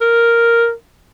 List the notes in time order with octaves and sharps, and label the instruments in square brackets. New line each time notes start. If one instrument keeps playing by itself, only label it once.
[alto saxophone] A#4